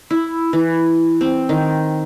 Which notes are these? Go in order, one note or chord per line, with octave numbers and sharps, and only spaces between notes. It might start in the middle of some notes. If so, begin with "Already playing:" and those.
E4
E3
C4
D#3